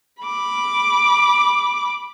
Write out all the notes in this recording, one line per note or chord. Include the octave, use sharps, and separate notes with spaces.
B5 D6